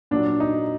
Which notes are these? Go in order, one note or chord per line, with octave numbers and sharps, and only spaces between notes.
A#2 F#3 D4
D#4